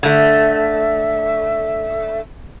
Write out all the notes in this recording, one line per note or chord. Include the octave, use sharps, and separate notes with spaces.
D3 A3 E5